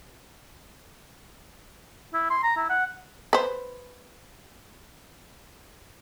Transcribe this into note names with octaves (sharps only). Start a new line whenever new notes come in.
E4
C6
A#5
E4
F#5
B4 C5